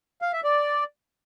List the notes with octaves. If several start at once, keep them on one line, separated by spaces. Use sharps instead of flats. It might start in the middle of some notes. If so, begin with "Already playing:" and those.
F5
E5
D5